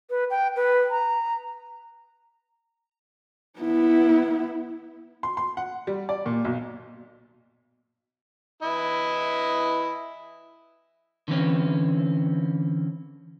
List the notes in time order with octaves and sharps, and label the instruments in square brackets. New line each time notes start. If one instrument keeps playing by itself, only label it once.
[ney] B4
G5
B4
A#5
[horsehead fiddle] B3 E4
[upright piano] C6
C6
F#5
G3
D5
A#2
B1
[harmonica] E3 E4 D#5
[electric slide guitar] D3 E3 C4 C#4